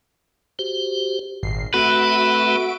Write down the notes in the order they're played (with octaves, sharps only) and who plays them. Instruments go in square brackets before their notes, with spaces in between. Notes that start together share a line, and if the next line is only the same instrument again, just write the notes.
[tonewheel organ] F#4 G4 C5
[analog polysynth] G#1 C7 [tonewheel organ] A#2
[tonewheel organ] A3 C4 A4 [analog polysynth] F#4 E5 D7 [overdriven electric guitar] B4